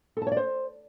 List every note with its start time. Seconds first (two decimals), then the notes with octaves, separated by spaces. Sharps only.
0.17 A4
0.22 A5
0.27 C#5
0.32 D5
0.37 C5